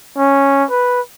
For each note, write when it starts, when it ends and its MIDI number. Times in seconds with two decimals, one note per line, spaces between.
0.18 0.64 61
0.70 1.01 71